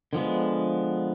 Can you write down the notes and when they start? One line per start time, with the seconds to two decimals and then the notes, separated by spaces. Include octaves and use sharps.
0.13 D3 F3 G#3 B3